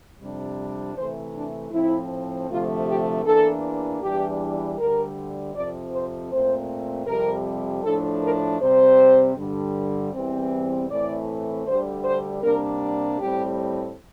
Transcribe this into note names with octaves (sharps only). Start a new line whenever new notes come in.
F2 C3 G3 D4
C3 E3 A3 C5
D4
A2 F3 C4 E4
D2 C3 F3 A3 F4
G4
E2 E3 A#3 D4 A4
E2 E3 G3 D4 G4
D2 D3 G3 A#4
F2 C3 F3 C4 D5
C5
A#2 A3 C4 C5
F2 C3 G3 A#4
A2 F3 A3 D4 A4
A#4
C3 G3 C4 C5
G2 D3 G3
E2 E3 G3 C4
A2 E3 A3 C4 D5
D2 D3 G3 C5
C5
C3 G3 A#3 D4 A#4
A2 G3 C4 G4